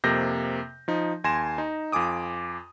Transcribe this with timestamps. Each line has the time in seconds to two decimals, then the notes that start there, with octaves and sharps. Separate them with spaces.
0.04 F2 C3 A#3 G6 A#6
0.88 F3 D#4
1.24 D#2 G#5 C6 A#6 E7
1.58 D#4
1.92 F2 F4 G#5 D6 D#6